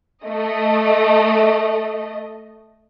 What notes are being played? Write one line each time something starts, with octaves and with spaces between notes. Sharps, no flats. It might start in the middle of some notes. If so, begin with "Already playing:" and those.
A3 D#5